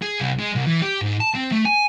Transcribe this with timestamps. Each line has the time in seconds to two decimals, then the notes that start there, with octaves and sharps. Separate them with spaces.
0.02 G#4
0.20 C2
0.39 G#3
0.55 C2
0.66 E3
0.82 G4
1.02 G#2
1.20 A5
1.35 C4
1.52 A3
1.65 G#5